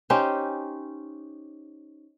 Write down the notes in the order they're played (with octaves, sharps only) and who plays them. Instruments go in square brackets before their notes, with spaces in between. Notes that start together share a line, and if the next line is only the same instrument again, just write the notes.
[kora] C#4 D#4 G4 C5